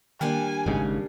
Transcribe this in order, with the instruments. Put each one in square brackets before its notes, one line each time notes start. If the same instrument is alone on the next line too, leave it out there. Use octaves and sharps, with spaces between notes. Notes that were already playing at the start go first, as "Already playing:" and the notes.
[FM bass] D#3 [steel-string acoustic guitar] G3 A#3 D4 [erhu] G#5
[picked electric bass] G#1 G#2 C#3